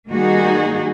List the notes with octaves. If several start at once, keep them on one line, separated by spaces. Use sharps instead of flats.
D#3 G3 A#3 D#4 F#4 G#4